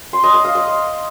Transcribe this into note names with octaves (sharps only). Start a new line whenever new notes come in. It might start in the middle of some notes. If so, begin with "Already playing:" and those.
C6
D#5
D#6
F5
D#5